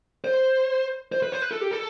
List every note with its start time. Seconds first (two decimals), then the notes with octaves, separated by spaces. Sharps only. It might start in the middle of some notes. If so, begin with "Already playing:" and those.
0.24 C5
1.12 C5
1.23 B4
1.32 C5
1.42 B4
1.52 A4
1.61 G4
1.71 A4